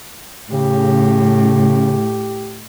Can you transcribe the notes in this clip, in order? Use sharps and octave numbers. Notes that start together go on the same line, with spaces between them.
A2 C#3 G4